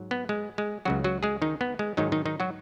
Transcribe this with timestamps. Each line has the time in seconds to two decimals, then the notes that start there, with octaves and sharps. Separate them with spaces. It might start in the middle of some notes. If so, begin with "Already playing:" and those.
Already playing: G#2 F#3
0.11 B3
0.29 G#3
0.58 G#3
0.85 C#2 C#3 F#3 F#4
1.04 F#3 F#4
1.23 G#3 G#4
1.42 D#3 D#4
1.61 B3
1.79 G#3
1.97 G#2 D#3 F#3 D#4
2.12 D#3 D#4
2.25 D#3 D#4
2.40 F#3 F#4